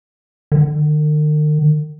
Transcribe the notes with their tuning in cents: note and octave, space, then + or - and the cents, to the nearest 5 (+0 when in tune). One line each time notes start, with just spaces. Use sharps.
D#3 -45